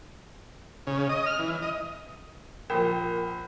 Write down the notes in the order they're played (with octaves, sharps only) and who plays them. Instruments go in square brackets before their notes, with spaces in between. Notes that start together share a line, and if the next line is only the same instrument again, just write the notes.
[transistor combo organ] C#3
D#5
F6
E3
D#5
[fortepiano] A#1 F3 [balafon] A#4 G5